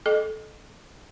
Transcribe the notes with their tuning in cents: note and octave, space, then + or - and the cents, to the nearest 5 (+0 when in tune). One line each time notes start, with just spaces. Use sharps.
A4 -20 D#5 -30 G5 +0